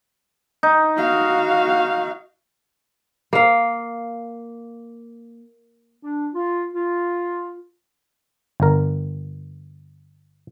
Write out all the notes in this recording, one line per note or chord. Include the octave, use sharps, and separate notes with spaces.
D#4
F#4 F5
A#3 F5
D4
F4
F4
G1 A#4